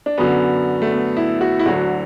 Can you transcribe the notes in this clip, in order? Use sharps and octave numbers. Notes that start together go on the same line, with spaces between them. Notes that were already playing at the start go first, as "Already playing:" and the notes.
D4
F#2 D3 F#3 B3
A3
B3
E4
F#4
E4
D2 D3 F#3 F#4